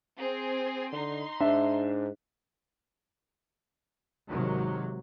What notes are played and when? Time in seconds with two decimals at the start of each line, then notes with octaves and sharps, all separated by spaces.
0.17 C4 G#4
0.92 D3 D#4 C6
1.40 G#2 D4 E5
4.29 G#1 C3 D#3 F#3